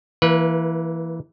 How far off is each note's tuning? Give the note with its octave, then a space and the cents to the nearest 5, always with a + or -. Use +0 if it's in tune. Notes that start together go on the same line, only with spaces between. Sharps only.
E3 +5 A#3 +0 B4 -25